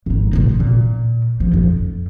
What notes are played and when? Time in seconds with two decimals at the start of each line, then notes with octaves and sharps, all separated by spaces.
0.06 G#1 D#4
0.33 A2 C3
0.60 A#2
1.40 F3
1.54 F2